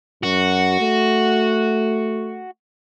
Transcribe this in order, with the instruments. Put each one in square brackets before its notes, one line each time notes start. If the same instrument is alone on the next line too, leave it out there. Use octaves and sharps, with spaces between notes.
[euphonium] F#2 [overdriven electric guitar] F#4
[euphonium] A3